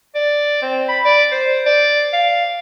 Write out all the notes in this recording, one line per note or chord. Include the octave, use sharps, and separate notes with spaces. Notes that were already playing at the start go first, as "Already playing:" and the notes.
D5
C4
B5
D5
C5
D5
F5